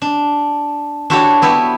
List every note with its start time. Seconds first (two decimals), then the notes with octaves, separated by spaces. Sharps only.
0.02 D4
1.10 D4 E4 F#4 G4 A4 C#5
1.42 B3 E4 G4 C#5